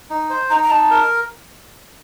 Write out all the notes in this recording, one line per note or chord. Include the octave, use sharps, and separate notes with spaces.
D#4
C5
D#4 A#5
A#5
D#4 A5
A#4